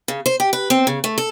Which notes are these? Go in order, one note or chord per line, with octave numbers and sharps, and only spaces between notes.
C#3
C5
G4
B4
C4
C#3
A3
A4